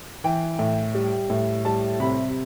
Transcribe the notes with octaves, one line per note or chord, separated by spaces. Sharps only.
E3 G5
A2
G3
A2
G3 A5
C3 B5